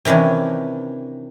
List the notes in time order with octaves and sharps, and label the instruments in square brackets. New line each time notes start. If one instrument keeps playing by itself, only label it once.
[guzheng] C3 D#3 E3 C#4 D4